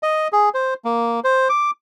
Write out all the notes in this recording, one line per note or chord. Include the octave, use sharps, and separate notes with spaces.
D#5
G#4
C5
A#3
C5
D6